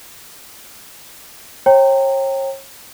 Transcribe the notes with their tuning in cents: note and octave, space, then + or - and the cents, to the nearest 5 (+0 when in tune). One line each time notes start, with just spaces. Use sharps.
C#5 -40 G5 +0 A#5 -25